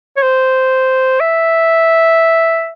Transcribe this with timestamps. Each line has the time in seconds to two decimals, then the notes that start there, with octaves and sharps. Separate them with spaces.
0.17 C#5
0.23 C5
1.21 E5